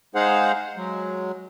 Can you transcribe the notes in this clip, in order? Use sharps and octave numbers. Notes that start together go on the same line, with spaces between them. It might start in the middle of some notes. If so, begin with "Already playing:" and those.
G#3 D#4 G#4 C5 F5 F#5
F#3 G#3